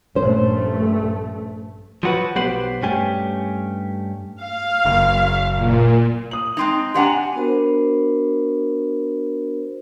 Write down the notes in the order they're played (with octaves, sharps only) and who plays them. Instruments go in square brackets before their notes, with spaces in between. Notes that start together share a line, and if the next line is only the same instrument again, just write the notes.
[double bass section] A#1 G2 A3 [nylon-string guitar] C#4 C5
[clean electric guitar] F3 F#3 F#4 B4
B1 B3 G4 B4 C5 F#5
G2 A3 C#4 G4 G#5
[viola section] F5
[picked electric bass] F#1
[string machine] A#2
[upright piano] D#6 F#7
[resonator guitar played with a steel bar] G#3 C4 D#4
[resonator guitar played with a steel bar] C4 D4 A#5 [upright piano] G4 F#5 G#5
[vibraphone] B3 D4 F#4 A#4 C5